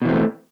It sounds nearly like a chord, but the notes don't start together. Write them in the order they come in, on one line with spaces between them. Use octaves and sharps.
B2 E3 C4 A3